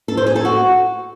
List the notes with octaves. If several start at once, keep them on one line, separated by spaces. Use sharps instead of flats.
A4
C5
G#4
A4
F#4